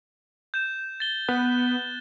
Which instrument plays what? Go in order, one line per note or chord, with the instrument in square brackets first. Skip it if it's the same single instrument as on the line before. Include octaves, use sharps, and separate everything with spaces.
[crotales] G6 E7
A6 G7
[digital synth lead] B3 [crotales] F#6